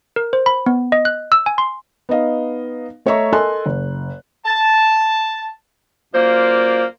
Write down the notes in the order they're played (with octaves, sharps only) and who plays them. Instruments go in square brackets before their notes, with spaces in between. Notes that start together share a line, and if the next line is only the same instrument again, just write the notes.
[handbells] A#4
C5
B5
B3
D#5
F#6
E6
G#5
C6
[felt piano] B3 D#4 D#5 F5
A3 C#5 D#5 E5 A#5 C#6
A4 A#4 D#5 G#5 C6 F#6
F#1
[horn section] A5
F#2 A#3 F4 C5 D5 F5